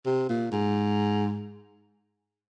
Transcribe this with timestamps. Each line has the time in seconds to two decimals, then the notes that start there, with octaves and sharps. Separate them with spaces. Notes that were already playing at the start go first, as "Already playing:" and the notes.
0.06 C3
0.29 A#2
0.52 G#2